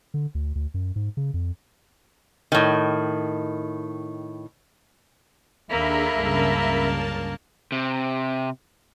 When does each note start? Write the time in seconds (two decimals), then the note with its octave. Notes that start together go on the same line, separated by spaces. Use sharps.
0.14 D3
0.35 D2
0.55 D2
0.74 F#2
0.96 G#2
1.17 C#3
1.34 F2
2.52 A2 D#3
5.70 D#2 A#3 D4 G#4 A4 E5 A#5 B5
6.15 C#2 G2 C#3 A#4 A5
7.72 C3